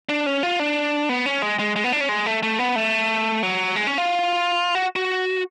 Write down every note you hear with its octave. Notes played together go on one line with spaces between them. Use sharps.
D4
C#4
F4
D4
B3
C#4
G#3
G#3
G#3
B3
D4
C#4
G#3
A3
A3
B3
A3
F#3
G#3
C#4
F4
F#4
F#4